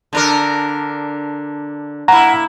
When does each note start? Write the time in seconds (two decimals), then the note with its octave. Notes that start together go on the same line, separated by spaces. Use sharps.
0.13 D3 D4 A#4
2.08 A#3 E4 F#5 A#5